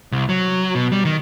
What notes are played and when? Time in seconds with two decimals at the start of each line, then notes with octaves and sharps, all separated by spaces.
0.12 C2
0.29 F#3
0.75 B2
0.92 G3
1.05 D#3